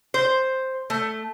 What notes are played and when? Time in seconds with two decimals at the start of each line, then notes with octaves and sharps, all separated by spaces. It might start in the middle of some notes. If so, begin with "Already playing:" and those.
0.14 C5
0.90 A3